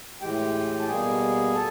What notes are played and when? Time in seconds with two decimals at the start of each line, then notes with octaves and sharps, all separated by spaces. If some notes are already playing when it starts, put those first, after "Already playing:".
0.21 A2 E3 G#3 G4 G5
0.80 A5
0.88 B2 G3 A#3 G#4 G#5
1.54 A4 A5